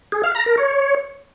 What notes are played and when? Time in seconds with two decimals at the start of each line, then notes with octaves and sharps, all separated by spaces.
0.12 G#4
0.24 F5
0.35 A#5
0.46 A#4
0.58 C#5